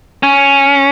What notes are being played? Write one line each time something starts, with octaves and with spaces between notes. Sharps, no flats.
C#4